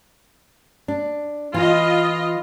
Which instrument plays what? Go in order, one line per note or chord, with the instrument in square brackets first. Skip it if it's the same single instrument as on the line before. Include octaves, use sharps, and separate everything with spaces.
[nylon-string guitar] D4
[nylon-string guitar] E3 [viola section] F4 D#5